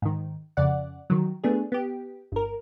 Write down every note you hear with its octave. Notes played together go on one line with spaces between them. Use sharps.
G#2 D#3
F2 C#3 D5 F#5
D#3 F#3
A3 B3 D4 G#4
B3 G4
G1 A#4